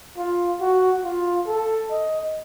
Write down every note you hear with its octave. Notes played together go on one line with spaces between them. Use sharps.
F4
F#4
F4
A4
D#5